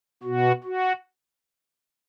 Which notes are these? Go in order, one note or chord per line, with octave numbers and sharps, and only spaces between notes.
B2 F#4
F#4